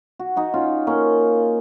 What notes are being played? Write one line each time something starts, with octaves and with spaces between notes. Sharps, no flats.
F#4
D#4 F#4
C#4 F4
A#3 C#4